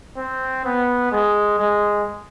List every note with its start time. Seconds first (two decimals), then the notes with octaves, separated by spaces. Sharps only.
0.16 C4
0.64 B3
1.12 G#3
1.59 G#3